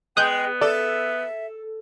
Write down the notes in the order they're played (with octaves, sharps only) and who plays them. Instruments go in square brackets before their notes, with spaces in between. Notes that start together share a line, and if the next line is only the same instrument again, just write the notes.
[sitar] G#3 [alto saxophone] B3 [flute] G5 [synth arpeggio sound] D#6 F#6 G6
[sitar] A4 [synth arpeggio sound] D5 [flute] E5